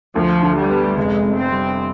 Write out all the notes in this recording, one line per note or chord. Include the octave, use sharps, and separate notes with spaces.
D2 F3
D3
G3
B3
F1 G#3
F2
C4
G3